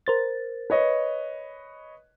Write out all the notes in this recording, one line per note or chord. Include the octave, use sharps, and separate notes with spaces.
A#4 C5 A6
B4 C#5 D#5